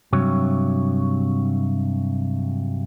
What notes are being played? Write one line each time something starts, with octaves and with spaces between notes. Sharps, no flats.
G2 C3 F#3 C#5